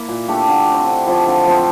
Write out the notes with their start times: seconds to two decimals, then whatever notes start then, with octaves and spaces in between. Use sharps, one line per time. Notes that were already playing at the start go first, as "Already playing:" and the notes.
Already playing: A#3 E4
0.08 A#2
0.28 A3 D4 G4
0.48 D3
0.67 A3 C4
0.86 D3
1.06 F3 A3 E4
1.26 D3
1.46 F3 C4